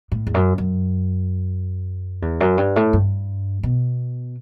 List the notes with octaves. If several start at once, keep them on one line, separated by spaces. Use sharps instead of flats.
A2
E2
F#2
F#2
E2
F#2
G2
A2
G2
B2